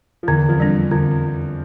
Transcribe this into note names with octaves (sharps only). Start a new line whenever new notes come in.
F3
E2 D3 E3
F2 F3
G3 D4
F2 D3 F3